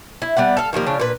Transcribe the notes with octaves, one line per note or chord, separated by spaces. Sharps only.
E4
G3 B3 D5 F#5
A4 F5
D#3 F3 G3 A#3
C#3 F3 D4
A#2 B4